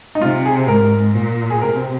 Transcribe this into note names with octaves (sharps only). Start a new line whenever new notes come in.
D#4
C3 F4
G#4
G#2 A#4
A#2
G#4
C3 A#4
C4